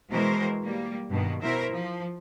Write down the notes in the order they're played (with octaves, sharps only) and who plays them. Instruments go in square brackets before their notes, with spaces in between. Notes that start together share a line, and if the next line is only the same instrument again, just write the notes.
[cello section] B2 E3 G#3 A#4 C5
G3 A#3
G2 B2 D#3
B2 E4 A#4 C5 E5
F3